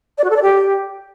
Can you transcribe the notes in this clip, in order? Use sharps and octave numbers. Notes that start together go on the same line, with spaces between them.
D5
F#4
A4
D5
G4